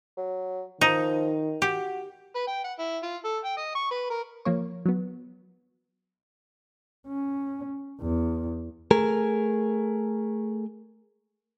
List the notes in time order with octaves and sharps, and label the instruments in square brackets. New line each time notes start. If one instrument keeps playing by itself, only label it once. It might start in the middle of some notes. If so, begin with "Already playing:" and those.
[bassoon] F#3
[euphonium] D#3 [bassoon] F3 [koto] D#4
[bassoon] F#4 [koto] G4
[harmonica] B4
G5
F#5
E4
F4
A4
G5
D#5
C#6
B4
A#4
[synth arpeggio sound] F3 A#3 C#5
F#3 B3
[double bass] C#4
E2
[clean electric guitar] A3 G#4 A#4